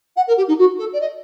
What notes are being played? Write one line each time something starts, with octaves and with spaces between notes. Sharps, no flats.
F#5
A#4
G4
D#4
F#4
A4
D5
D#5